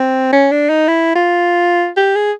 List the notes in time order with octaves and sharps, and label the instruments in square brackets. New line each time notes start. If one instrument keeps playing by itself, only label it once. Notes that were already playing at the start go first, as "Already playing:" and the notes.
Already playing: [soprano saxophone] C4
C#4
D4
D#4
E4
F4
G4
G#4